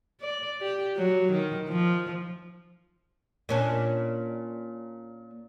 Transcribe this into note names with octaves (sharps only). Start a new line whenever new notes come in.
D5
G4
F#3
D#3
F3
A#2 C#4 D4